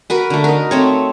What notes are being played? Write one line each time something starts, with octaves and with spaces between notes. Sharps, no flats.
F#4 A#4 B4
D3 A3
D#4 A#4
A3 C4 C#5